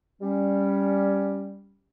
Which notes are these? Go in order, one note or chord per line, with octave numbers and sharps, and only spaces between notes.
G3 C#4